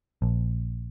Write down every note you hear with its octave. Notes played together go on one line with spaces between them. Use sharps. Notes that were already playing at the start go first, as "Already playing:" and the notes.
A#1